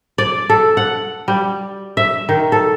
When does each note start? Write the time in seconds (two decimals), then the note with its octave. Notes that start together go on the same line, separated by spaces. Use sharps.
0.18 D5
0.50 A4
0.77 F#5
1.28 G3
1.97 E5
2.29 D#3
2.52 A4